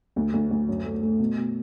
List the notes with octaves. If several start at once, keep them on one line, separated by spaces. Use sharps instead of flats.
D2
D2
D2
F#2
A3
A3
B2
B2